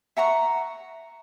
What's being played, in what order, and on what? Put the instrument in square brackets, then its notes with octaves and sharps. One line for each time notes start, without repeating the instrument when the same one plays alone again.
[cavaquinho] E5 F#5 A#5 C#6